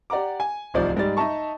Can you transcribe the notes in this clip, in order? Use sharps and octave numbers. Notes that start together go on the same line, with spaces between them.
G4 D5 F#5 A#5 D6
G#5
D1 C2 F3 D#4 D5
G#2 G3 G#3 D#4 D5 A6
D#4 D#5 E5 A5 C#6